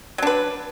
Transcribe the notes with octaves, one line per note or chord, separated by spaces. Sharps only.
F#3 D4 B4